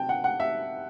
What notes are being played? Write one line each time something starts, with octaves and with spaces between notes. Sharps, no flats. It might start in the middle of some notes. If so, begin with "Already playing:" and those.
Already playing: C3 F#3 C4 G5 A5
F#5
F#5
E5